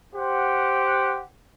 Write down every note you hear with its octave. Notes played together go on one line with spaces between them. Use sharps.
G4 C5 F#5